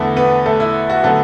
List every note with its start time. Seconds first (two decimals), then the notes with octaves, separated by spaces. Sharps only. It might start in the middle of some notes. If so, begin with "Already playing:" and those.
Already playing: E2 D3 A3 B3 A4
0.16 B3 B4
0.46 A3 A4
0.60 E4
0.90 F#4
1.03 D3 F#3 A3 B3 A4